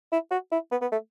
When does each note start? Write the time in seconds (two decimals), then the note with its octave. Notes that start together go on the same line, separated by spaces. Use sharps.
0.12 E4
0.31 F#4
0.52 E4
0.71 B3
0.82 B3
0.92 A3